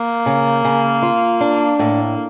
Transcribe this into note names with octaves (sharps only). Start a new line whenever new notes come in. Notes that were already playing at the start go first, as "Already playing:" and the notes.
Already playing: A#3
C#3
C#3
F4
D4
A2 A#3